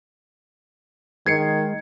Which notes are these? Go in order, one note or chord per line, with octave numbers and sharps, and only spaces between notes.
D#3 G#3 G#6 C7 C#7